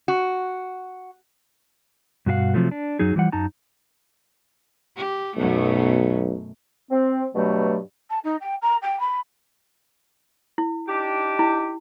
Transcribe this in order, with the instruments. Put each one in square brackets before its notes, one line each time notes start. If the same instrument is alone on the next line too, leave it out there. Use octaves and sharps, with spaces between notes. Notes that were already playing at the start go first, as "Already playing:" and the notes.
[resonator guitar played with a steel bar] F#4
[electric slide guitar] G2 B2 F#4 G4 F5 F#5
C3 F3 F#3 A3
D4
F#2 F#3 D#4 G#4
E2 E3 F3 G3 F#5
F#2 F#3 D#4 A5 A#5
[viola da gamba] G4
[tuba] B1 [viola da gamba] F#2 B2 A3
[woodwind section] C4
G2 B2 F#3 A3
[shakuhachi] A5
D#4
G5
A#5
G5
B5
[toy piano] E4
[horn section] D4 D#4 G4
[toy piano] E4